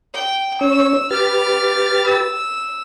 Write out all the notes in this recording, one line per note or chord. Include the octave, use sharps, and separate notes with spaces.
G5
C#4 C#5 E6
G4 B4 D6 F6 A6
E6